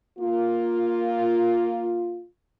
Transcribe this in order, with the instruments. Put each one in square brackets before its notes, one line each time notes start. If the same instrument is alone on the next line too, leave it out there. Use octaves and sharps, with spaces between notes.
[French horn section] A#3 F4